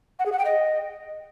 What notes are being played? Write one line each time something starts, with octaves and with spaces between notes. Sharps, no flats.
F#5
G#4
F#5
G5
D#5